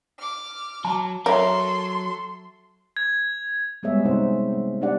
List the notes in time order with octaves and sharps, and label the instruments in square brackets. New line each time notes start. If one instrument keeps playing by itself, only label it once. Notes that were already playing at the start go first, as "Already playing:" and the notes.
[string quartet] D6 F6
[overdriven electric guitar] F#3 [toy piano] A5 A#5
[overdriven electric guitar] F#3 [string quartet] A4 C6 [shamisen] A#4 C#5 [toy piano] E5 D6
[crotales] G#6
[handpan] G3 G#3 B3 G#4 C#5 E5
C3 C4 D#4 C5 F#5
A#3
B3 D4 D#4 G4 D5 F#5